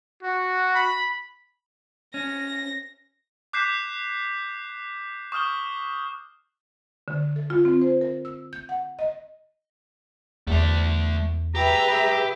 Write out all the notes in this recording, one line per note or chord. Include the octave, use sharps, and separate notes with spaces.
F#4
B5
C#4 A#6
D6 F#6 G6 B6 C7 E7
C#6 D#6 F6 G6 G7
D3
A4
F4
C4
C5
A#4
E6
G6
F#5
D#5
E2 A3 D5
G4 G#4 B4 E5 G5 A#5